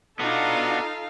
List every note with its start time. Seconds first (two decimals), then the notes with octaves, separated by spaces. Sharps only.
0.19 B3 D4 D#4 F4 F#4 A4 F5